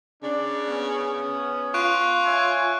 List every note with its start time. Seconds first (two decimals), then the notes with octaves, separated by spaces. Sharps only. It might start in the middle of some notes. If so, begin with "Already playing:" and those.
0.23 C#3 D4
0.67 B3 C#4
1.74 F4 C#6 F#6 D7
2.25 C#5 E5 G#5